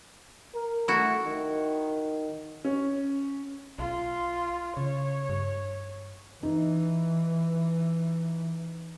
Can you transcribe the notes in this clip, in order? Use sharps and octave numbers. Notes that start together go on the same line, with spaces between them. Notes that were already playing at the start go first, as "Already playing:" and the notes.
A#4
A3 E4 F#4
D#3
C#4
B1 F4
C#3 C#5
G2
E3 D#4